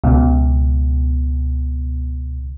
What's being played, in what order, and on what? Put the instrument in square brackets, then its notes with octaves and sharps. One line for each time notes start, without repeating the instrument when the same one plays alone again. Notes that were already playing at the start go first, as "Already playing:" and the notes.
[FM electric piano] C#2 B2